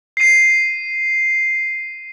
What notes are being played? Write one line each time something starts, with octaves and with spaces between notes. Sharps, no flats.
C7 D#7